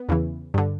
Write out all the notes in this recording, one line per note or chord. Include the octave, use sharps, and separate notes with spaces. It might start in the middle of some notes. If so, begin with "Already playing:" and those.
Already playing: B3
E2 C#3 E3
G2 D3